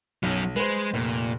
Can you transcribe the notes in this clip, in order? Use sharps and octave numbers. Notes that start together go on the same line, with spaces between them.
B1 F#3 C#4
G#3 B4 C5
F1 A#2